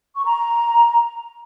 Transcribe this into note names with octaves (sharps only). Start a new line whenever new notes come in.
C#6
A#5